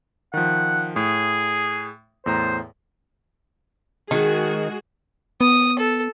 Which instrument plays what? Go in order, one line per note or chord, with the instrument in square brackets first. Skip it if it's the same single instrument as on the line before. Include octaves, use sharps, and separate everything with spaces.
[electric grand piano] D#3 F3 [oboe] F#5
[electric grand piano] A2 [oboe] G#4
[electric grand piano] E2 A2 A#5 [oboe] C5
[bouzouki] D#3 [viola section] G#3 F#4 G#4
[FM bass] B3 [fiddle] D#6
[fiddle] A4